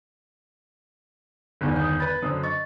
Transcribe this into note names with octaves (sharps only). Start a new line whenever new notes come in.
G1 E2 D#3
D#6 G6
B4 B5 A6
F#2 D3 C5 D#6
D#5 C#6 A6